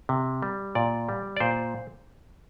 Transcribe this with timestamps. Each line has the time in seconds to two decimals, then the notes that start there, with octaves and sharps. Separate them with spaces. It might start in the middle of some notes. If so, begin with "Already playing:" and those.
0.09 C3
0.42 G3
0.75 A#2 D5
1.09 G3
1.37 D5
1.40 A#2 C5